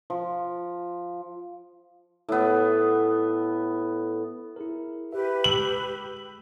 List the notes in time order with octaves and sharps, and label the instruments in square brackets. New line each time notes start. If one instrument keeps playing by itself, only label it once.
[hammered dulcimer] F3
A2 B3
[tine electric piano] E4 G#4 A#4
[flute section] G4 B4 [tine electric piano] E5
[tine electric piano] G#3 E6 [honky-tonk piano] F#7